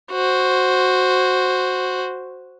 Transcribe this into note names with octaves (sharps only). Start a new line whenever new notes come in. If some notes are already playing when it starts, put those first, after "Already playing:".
F#4 C5